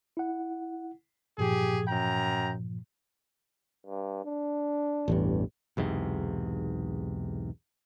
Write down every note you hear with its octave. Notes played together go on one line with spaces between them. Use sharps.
E4 F#5
G2 A#2 F3 G4 G#4
F#2 G5 A#5
G2
D4
A1 E2 G2
B1 E2 G#2 C3